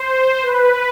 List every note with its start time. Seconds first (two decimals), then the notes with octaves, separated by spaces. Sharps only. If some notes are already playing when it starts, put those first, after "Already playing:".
Already playing: C5
0.42 B4